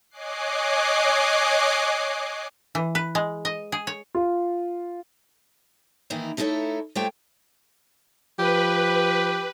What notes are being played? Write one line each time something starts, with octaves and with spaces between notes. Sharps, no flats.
C#5 D#5 G#5 D6 F#6 C7
E3
B4
G#3
D#5
G#4
C#5
F4
D#3 E3 A#3 D#4 E4
A3 D#4 E4 G#4 A4 C#5
G3 A3 F4 C5 C#5 G5
F3 G4 B4